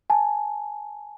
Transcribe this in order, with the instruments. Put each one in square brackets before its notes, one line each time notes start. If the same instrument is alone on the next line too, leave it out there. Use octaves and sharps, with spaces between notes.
[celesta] G#5 A5